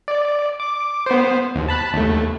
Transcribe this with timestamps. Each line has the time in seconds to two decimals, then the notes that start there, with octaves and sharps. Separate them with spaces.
0.08 D5
0.60 D6
1.06 B3 C5
1.55 D#2
1.69 A5 B5 F#6
1.94 D#2 A3